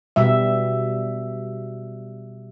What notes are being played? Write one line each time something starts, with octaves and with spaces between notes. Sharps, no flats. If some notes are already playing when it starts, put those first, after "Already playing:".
B2 G3 E5